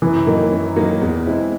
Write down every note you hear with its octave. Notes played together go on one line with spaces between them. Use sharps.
F#2 E3
D#3 F#3 A#3 D#4
F#2
D#3 F#3 A#3 D#4
E2
B2 G#3 C4 E4